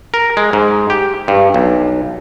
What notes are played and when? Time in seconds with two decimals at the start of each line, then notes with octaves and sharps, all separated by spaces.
0.14 A#4
0.37 G#3
0.53 G#2
0.90 G4
1.28 G2
1.54 B1